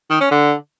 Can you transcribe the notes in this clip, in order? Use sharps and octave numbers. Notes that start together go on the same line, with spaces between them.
D#3
C#4
D3